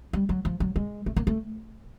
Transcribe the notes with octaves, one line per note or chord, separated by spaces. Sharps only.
G3
F#3
F3
F#3
G#3
A3
A#3
A3